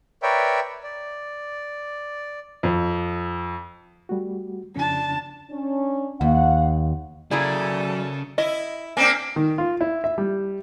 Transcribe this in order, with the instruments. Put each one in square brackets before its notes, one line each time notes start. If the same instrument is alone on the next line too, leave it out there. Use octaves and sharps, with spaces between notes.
[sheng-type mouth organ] A#4 B4 C#5 D5 E5 G5
D5
[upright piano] F2
[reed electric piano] G3 A3 F#4
[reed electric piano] F2 C#3 C#4 [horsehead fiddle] D4 A5
[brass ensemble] C#4 D4
[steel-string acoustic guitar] D#2 [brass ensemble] F5 F#5
[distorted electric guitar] C#3 [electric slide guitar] F#3 D5 [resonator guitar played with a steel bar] A#3 E4 G#4 [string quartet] A4
[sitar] E4 [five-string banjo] D#5
[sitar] A#3 C4 D4 [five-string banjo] G#5
[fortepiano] D#3
F4
E4
E5
G3